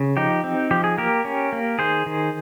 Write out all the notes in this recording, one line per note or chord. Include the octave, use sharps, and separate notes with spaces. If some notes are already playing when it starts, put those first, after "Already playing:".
Already playing: C#3
F3 D#4 G4
C4
F3 G4
G#4
A#3 G4 A#4
C#4
A#3
D#3 G#4 C5
D#3